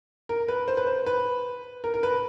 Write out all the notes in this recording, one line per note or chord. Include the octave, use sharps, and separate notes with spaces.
A#4
B4
C5
B4
C5
B4
A#4
A#4
B4